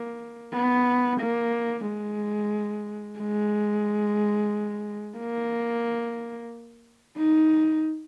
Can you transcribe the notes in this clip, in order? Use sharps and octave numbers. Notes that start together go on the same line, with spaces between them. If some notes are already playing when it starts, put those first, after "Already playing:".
Already playing: A#3
B3
A#3
G#3
G#3
A#3
D#4